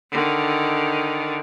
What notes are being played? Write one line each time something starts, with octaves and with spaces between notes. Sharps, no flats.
D3 D#3